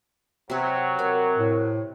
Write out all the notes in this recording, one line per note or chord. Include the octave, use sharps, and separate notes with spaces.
C3 F#3 B4
C3 A#4 D5
A2